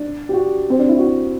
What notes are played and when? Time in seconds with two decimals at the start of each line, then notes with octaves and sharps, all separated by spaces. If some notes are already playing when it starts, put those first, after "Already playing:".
Already playing: D4
0.29 G4
0.33 F#4
0.70 C4
0.79 D4
0.88 E4
0.98 F#4